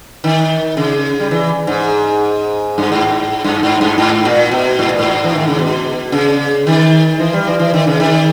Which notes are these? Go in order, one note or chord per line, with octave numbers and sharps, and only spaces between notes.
D#3
C#3
G3
E3
G#2
G2
G#2
G2
G#2
G2
G#2
A#2
B2
G#2
A#2
G#2
E3
D#3
C#3
B2
C#3
D#3
E3
G3
E3
E3
D#3
C#3
D#3